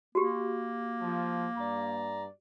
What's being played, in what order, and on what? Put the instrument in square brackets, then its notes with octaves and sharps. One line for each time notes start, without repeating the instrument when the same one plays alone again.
[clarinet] A#3 [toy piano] F#4 G4
[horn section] F3
G2 D5 A#5